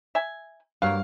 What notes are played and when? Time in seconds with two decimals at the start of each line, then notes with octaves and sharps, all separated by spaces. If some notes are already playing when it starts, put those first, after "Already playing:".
0.15 E5 G#5
0.82 G2 F#3 G3 A#3 C#5 F5